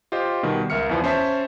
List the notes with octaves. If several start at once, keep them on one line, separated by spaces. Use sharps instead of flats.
F4 G4 C5 D#5
B2 D#3 G3
C#2 A#4 E5 F6 C#7
E2 E3 F3
C#4 C5 E5 A5 B6